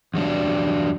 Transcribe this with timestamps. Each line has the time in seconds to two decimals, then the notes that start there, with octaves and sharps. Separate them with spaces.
0.14 E2 F#3 G3 D4